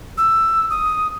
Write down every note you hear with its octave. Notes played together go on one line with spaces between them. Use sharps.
E6
D#6